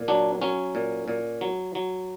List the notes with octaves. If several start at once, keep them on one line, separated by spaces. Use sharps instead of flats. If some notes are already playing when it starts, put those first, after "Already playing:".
Already playing: A#2
F#3 D4
F#3 C#4
A#2
A#2
F#3
F#3